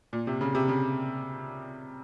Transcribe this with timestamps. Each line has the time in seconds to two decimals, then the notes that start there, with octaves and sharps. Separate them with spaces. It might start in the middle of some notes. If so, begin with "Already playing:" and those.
0.13 A#2
0.27 C3
0.41 C#3
0.55 C3
0.68 C#3